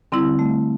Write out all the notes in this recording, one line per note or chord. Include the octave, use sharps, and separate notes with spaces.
D3 G3 C4 E4
A3